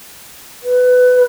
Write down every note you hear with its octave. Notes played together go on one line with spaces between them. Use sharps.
B4